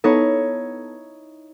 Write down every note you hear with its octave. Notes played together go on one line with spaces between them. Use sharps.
B3 D#4 E4 A4 C#5